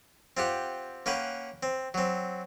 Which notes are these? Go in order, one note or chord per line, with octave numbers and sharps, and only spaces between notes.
C4 F4 G4 F#5
A#3 C#4 B4 F#5 G5
C4
F#3 C4